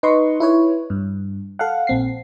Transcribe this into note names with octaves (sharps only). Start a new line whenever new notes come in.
D#4 B4 D#5 C6 C#6
E4 B4 C#5
G2
A4 F5 F#5
A#1 C4 C7